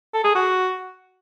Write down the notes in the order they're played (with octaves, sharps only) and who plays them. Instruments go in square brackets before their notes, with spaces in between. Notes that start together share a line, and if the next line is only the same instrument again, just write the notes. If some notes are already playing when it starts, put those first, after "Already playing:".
[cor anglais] A4
G#4
F#4